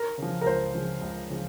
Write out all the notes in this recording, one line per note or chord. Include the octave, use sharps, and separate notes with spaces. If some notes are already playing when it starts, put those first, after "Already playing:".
Already playing: A#4
C#3 F3
A#4
C#2 C5
C#3 F3
C#2
C#3 F3